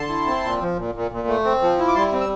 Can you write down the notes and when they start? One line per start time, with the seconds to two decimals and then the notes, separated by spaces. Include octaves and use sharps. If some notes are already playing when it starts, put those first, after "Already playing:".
Already playing: D3 A5 C6
0.10 E4
0.27 C4
0.43 A#2
0.61 F3
0.77 A#2
0.95 A#2
1.11 A#2
1.28 A3
1.45 C4
1.61 F3
1.79 E4
1.88 D6
1.95 G3 A5 C6
2.12 C4
2.21 E6